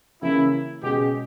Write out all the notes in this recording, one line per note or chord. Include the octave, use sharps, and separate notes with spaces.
C#3 E3 A#3 C#4 E4
B2 G#3 C#4 G4 G#4